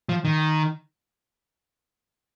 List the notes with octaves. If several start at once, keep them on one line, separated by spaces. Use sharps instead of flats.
F3
D#3